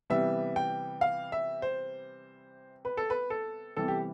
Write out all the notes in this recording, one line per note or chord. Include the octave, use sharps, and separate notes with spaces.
C3 E3 G3 B3 E5
G5
F5
E5
C5
B4
A4
B4
A4
C3 E3 G3 B3 A4
G4